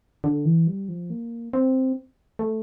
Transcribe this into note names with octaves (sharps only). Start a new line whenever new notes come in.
D3
E3
G3
F3
A#3
C4
A3